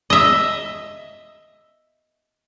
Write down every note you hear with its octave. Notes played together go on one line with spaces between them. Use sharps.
D#5 E5